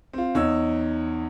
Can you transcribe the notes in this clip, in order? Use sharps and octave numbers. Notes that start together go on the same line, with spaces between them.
C4 F4
E2 D#4 C#5 E6